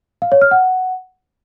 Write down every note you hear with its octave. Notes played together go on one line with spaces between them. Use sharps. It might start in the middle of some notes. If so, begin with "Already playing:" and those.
F5
C#5
F6
F#5